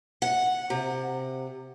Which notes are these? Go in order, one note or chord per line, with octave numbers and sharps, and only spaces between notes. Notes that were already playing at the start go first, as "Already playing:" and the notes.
F#5
C3